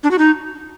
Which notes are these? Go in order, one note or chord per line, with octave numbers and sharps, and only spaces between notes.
D4
F#4
D#4